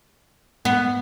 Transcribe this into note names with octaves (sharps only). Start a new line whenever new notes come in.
B3